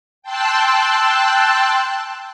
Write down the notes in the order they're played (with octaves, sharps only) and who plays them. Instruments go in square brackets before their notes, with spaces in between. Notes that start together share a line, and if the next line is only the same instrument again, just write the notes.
[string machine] G5 A5 C6 E6 F#6